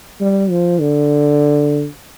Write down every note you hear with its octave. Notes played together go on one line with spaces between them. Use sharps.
G3
F3
D3